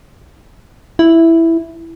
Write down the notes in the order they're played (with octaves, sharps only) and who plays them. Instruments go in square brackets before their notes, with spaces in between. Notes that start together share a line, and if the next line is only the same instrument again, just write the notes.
[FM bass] E4